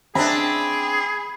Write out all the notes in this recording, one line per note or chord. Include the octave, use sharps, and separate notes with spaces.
C4 D4 G#4 B5